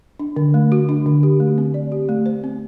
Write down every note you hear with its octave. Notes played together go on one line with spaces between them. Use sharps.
D4
D3
A3
F#4
D4
D3
G4
A3
C4
D5
G4
A3
C5
C4